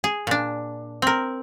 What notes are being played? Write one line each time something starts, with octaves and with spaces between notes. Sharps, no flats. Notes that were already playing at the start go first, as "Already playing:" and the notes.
G#4
A#2 D4
C4 A#4